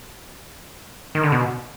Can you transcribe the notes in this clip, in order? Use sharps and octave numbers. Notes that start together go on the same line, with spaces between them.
D#3
D3
B2